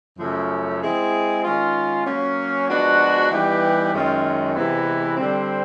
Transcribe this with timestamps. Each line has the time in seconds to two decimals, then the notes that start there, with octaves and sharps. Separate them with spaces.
0.19 F#2 C#3 F3 A3 C#4
0.81 G#3 C4 E4 G#4
1.44 D#3 G#3 C#4 F4
2.06 F#3 A#3 C#4
2.68 F3 G#3 B3 D4 F#4
3.31 E3 G3 B3 D#4 G4
3.94 F#2 D#3 G#3 C#4 F4
4.55 C3 E3 G#3 B3 E4
5.17 D3 G3 C4